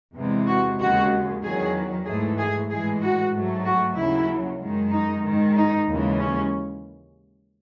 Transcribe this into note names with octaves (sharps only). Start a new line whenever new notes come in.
E2 C3 E3 G#3
F#4
D#2 C#3 G#3 F#4
E2 D#3 F#3 G#4
G#2 E3 A3 G#4
G#4
A2 E3 G#3 G#4
F#4
G#2 F#3 A3
F#4
D#2 C#3 F#3 E4
F#2 D#3 G#3
D#4
G#2 D#3 G#3
D#4
D#2 C#3 E3 G#3
C#4